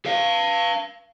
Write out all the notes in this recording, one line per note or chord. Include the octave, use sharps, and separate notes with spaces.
B4 F5